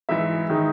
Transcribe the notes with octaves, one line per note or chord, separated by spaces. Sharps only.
G#2 E3 G#3 E5
D#3 G#3 D#4